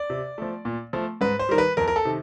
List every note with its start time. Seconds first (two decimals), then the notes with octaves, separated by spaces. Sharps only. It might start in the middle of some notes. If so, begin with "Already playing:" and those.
Already playing: D5
0.10 C3
0.38 F3 A3
0.65 A#2
0.93 F3 A3
1.21 G#2 B4
1.39 C5
1.49 D#3 G3 A#4
1.58 B4
1.77 F2 A#4
1.88 A#4
1.96 A4
2.05 C3 D#3